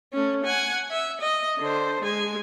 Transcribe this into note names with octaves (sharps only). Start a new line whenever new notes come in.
A3 C#4
F#5 G#5
E5
D#5
D3 C5
G#3 G#5